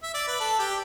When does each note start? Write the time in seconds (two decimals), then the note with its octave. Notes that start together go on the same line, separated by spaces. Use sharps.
0.03 E5
0.14 D5
0.27 B4
0.40 A4
0.59 G4